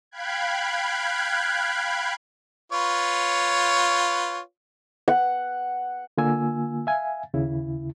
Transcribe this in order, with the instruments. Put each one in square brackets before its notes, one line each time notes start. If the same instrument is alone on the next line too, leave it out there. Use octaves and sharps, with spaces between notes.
[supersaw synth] F5 G5 B5 F#6 G#6
[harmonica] F4 B4 C#5
[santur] F#5
[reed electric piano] D3 A#3 F4 G#5 E6
E5 F5 G#5
D#2 C#3 E4